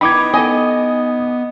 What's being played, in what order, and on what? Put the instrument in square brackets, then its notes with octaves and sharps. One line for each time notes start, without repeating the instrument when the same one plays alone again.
[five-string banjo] B3 E4 G5 [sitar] D#4 [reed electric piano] B5 D6 G#6
[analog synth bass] B3 [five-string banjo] A4 G5 G#5 [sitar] D#5